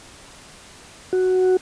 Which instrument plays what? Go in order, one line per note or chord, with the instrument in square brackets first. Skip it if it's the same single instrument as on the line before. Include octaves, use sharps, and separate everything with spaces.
[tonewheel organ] F#4